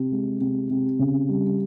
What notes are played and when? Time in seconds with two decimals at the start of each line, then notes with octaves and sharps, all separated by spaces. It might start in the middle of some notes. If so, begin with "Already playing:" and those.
Already playing: C3
0.12 G#3
0.41 C3
0.70 C3
0.99 C#3
1.29 G3